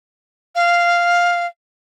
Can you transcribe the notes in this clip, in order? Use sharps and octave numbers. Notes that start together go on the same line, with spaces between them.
F5